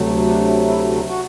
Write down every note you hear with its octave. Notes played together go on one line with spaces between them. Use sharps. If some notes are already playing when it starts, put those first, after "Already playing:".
Already playing: D2 C3 F#3 A3
D4
E4
F#4